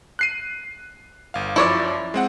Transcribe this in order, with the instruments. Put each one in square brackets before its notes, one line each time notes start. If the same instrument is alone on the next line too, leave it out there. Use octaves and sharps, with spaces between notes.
[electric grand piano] F#6 C7 D#7
G1 F5
[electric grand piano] F#2 F3 [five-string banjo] E4 C#5 D5
[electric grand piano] G#3 C4 F#5